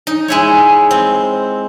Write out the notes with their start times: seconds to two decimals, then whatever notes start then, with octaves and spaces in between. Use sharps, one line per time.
0.07 D#4
0.28 G#3 E4 C#5
0.91 C4